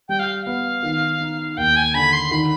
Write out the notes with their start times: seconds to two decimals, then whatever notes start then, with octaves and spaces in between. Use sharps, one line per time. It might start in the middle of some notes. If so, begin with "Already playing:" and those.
0.09 G3 G5
0.19 F5
0.42 B3 F5
0.83 D#3
1.21 D#4
1.57 D#2 G5
1.76 G#5
1.94 D3 B5
2.13 C6
2.31 D#3 B5